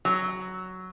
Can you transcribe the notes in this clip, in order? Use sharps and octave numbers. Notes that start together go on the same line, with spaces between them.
F#3